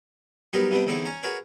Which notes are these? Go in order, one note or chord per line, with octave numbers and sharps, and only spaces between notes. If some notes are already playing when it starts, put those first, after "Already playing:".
F#3 G3 B3 D#4 G4 A#4
C3 G3 B3 C4 D4
E2 D3 C4 D#4 E4 C#5
C#4 C#5 A#5
F#4 G#4 A#4 B4 C#5